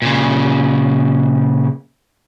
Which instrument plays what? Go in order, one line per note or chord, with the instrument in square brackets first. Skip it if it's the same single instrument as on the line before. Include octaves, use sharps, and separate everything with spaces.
[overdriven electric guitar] A#2 C#3